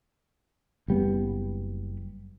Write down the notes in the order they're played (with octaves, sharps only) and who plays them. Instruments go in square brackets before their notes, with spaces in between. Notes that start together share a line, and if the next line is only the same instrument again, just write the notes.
[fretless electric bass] F#1 G3 B3